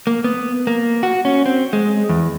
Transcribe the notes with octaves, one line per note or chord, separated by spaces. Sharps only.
A#3
B3
A#3
F#4
C#4
C4
G#3
E2